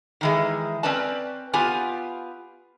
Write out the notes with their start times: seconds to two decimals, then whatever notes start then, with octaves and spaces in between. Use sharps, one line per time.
0.21 D#3 E3 G#3
0.83 C4 C#4 B4 D5 A5
1.53 B3 F4 G4 G#5